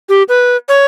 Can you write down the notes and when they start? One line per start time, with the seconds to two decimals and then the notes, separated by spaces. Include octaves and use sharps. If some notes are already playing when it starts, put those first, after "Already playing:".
0.09 G4
0.29 B4
0.69 C#5